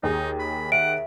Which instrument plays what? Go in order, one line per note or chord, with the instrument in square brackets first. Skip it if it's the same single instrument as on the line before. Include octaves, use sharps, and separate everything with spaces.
[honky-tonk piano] D#2 G#4 [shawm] D#4
[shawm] B5
[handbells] E5 [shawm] F#5 [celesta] D7